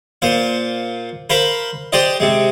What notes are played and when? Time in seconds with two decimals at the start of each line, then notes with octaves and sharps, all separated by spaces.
0.22 A#2 C5 F5
1.30 A#4 C5 F5 B5
1.92 G4 C5 D5 D#5
2.20 C3 G#3